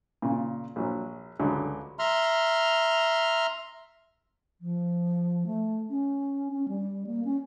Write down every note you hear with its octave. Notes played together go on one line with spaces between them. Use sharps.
A#2 C#3
A#1 F#3
C#2 D3 F#3
E5 A#5 C6 F6
F3
A3
C#4
C#4
G3
A#3
C#4